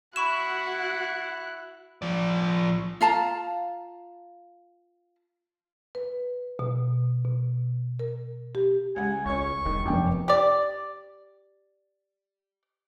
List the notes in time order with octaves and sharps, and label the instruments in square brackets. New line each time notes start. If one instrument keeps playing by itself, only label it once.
[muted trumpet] E4 [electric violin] F#4 F#5 [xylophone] B5 C#6 E7 [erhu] F#6
[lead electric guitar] F3 D5
[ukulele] F4 F5 A5 A#5
[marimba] B4
B2
B2
A#4
G4
[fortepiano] C#2 F#5 [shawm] G#5
[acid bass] C#2 [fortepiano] C#4 C#5 [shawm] C#6
[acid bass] E1 [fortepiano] D#3
[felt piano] F1 G5 D6 [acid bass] F#2
[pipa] G4 D5